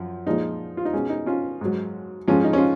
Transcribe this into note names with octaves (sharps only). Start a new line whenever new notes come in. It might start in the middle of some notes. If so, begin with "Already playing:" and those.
Already playing: F#2 F3
A#2 F3 G#3 D#4
F4
D#4
B2 G#3 C#4
D#4
C#4 F4
G#2 F#3
G#2 F3 G#3 C#4 F4
D#4
C#4
F4